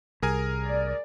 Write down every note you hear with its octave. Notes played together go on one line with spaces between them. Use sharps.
C2 G#4 A#4 G#5
D5